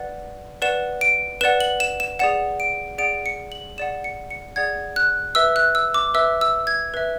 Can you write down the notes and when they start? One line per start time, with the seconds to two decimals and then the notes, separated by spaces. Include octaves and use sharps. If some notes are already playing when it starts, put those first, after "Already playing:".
Already playing: B4 D5 F#5
0.62 B4 D5 F#5 E7
1.01 D7
1.41 B4 E7
1.44 D5 F#5
1.60 F#7
1.80 E7
2.00 E7
2.19 G#4 D5 F#5 E7
2.60 D7
2.98 G#4 D5 F#5 D7
3.26 C#7
3.52 F#7
3.78 G#4 D5 F#5 E7
4.04 C#7
4.30 C#7
4.56 G#4 D5 F#5 G#6
4.96 F#6
5.35 B4 E5 E6
5.56 F#6
5.75 E6
5.94 D6
6.14 B4 E5 E6
6.41 E6
6.67 G#6
6.94 B4 E5